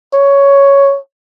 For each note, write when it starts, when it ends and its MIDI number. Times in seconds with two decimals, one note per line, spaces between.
0.13 0.98 73